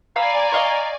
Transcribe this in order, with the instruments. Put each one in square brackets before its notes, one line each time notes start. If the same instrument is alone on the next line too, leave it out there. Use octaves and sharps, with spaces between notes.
[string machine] D5 G#5 [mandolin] F5 B5 E6 [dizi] A#5
[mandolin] D#5 F5 C#6